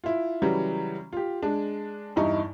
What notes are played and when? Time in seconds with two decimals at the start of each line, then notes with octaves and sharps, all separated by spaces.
0.04 E4 F4
0.42 C#3 E3 F#3 G3
1.13 F4 G4
1.43 G#3 D4
2.16 E2 G2 D#4 E4 C#6